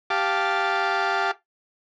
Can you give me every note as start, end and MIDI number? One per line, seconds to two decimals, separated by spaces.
0.10 1.31 67
0.10 1.31 77
0.10 1.31 81
0.10 1.31 86